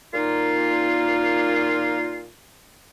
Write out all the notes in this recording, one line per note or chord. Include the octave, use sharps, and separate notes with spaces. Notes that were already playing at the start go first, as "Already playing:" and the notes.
A#2 D#4 F4